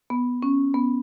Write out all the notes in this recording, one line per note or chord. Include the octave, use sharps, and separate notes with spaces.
B3
C#4
B3